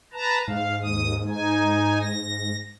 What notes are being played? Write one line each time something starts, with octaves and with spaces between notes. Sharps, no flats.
B4 A5 A#5
G#2 F5
D#2 D#6
D#4 G#5
A#6